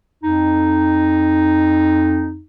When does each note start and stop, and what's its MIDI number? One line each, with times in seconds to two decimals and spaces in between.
0.23 2.41 41
0.23 2.41 63